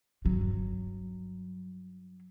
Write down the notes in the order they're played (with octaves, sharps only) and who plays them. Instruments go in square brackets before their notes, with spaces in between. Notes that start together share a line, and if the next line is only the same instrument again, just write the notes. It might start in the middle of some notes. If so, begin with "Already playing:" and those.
[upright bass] G2 F#3